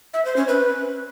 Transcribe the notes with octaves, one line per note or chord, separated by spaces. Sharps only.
E5
C5
C#4
B4